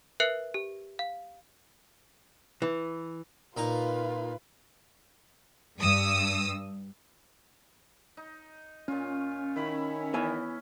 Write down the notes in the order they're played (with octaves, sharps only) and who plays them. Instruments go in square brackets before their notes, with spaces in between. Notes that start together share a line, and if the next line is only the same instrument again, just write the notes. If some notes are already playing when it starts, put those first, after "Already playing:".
[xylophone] A#4 B4 E5 F#6 C7 C#7
G4
F5
[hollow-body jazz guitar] E3
[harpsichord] A#2 D#4 A#5 [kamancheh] F4 B4
[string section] G2 D#6 E6
[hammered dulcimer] D#4
[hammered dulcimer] A#2 F4 [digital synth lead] C#4
[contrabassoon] D#3 [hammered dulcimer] E4 B5
[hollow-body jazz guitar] B3 E4 G#5 [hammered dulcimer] C#4